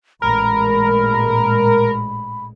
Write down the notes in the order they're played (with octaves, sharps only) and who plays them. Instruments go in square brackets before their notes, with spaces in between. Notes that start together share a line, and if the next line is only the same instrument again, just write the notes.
[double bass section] A1 A#2 G#3 [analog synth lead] A#4 [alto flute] B5